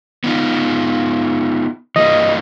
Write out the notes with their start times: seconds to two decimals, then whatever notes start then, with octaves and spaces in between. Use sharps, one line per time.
0.24 B3 D#4 F4
1.96 E3 G3 A#3 D#5